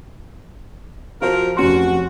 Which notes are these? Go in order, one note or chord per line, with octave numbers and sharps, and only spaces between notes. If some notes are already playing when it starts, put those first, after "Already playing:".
F3 F4 F#4 A#4 C5
F1 C#4 F#4 C6